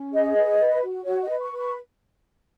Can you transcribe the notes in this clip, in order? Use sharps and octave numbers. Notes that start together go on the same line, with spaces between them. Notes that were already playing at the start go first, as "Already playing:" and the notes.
Already playing: C#4
G#4 D#5
B4
B4
F#4
F#4 C#5
D#5
B4
C#6
B4
C#6